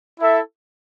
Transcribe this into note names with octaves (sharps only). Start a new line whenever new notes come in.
E4 A4 E5